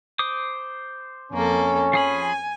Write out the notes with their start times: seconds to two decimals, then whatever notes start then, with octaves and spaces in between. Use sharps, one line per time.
0.19 C5 D6 D#6
1.32 F2 A#3 C#4 A4
1.93 F3 G#4 G#5 B5